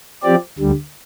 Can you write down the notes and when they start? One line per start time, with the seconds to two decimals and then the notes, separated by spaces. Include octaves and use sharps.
0.22 F3 C4 G4 D5
0.59 D2 D3 G3